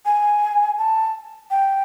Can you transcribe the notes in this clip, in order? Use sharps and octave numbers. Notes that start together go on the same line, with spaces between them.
G#5
A5
G5